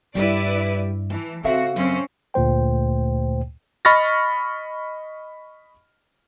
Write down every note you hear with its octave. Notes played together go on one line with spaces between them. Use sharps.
G2 G3 E4 B4 D5
E3 A5
C#3 C4 F#4 A4 E5 F5
F#2 C4 C#4
D2 A#2 A3 C5 G5
D#5 B5 C#6 F6 A6 A#6